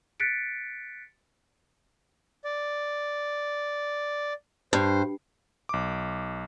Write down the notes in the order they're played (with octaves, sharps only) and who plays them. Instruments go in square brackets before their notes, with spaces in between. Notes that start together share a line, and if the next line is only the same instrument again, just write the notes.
[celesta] F#6 A6 B6 C#7 D7
[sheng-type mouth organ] D5
[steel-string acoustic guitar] G2 [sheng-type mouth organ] C5
[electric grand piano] B1 D6